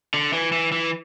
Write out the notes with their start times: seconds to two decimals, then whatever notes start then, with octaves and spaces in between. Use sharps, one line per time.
0.14 D3
0.33 E3
0.52 E3
0.72 E3